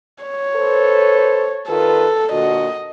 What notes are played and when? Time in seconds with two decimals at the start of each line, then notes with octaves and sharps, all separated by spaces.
0.24 C#5
0.56 A4 B4 C5
1.69 D#3 F4 A4 B4
2.32 A#2 D3 F#4 D#5